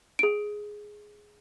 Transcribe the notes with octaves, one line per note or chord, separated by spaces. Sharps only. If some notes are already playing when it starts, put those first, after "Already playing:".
G#4 D7